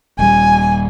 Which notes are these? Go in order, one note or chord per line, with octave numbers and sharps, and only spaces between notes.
D#1 G3 G#5